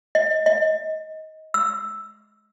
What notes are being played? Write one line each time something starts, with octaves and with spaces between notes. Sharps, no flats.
D#5
D#5
E6